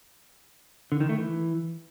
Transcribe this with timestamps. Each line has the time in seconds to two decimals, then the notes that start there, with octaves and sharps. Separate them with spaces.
0.92 D3
1.00 D#3
1.09 A3
1.18 E3